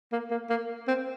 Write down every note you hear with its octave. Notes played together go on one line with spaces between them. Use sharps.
A#3
A#3
A#3
C4